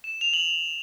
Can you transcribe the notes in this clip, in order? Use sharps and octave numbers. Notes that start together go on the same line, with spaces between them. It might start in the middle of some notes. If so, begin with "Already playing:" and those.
E7
F7
F#7
F7